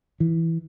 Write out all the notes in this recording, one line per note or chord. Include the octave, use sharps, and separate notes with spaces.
E3